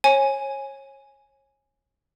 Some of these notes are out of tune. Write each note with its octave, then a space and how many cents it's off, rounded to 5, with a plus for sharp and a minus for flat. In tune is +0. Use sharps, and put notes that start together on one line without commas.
C#5 -30 G#5 +0